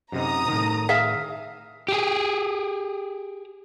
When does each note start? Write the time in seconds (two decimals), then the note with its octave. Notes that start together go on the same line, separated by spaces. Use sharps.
0.12 F#2 C3 D#4 A#5 D#6
0.48 A2 D#3
0.89 G#4 E5 F5
1.88 G4 G#4